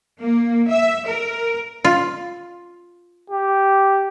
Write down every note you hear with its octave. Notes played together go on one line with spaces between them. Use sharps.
A#3
E5
A#4
F4
G4